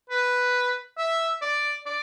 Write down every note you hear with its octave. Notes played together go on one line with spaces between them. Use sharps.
B4
E5
D5
D5